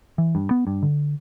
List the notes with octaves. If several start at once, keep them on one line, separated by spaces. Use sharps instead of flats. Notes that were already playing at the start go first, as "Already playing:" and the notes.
E3
G2
B3
G2
D3